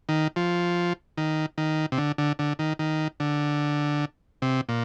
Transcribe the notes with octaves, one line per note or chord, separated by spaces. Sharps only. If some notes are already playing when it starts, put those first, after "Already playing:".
D#3
F3
D#3
D#3
C3
D3
D3
D3
D#3
D#3
D3
C3
A#2